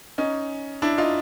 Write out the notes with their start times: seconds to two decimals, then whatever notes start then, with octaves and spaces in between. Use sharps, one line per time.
0.18 C#4 D#4
0.82 D4 E4
0.98 D#4 F4